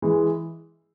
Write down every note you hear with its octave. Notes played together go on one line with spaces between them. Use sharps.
E3 G#3